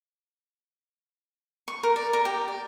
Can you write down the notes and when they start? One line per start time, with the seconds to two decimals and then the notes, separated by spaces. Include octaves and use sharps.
1.68 C#6
1.83 A#4
1.96 D5
2.13 A#4
2.25 G4
2.48 D5